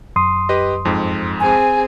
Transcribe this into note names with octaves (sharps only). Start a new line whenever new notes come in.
F#2 C6 D#6
G4 B4 D#5
F2 G#2
C4 G#4 G#5